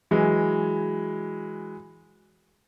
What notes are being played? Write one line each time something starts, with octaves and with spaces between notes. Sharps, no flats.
E3 F#3 G#3